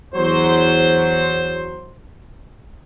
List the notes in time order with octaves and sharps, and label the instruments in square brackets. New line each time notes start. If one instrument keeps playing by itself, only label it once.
[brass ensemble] E2 F#3 C5